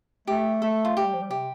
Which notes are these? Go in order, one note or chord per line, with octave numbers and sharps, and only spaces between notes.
A3 G4
A3 A4
F4
A3 G4
G3
F3
G3
C3 G4